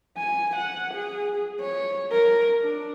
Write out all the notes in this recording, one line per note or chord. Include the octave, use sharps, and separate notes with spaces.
G#5
F#5
G#4
C#5
A#4
D4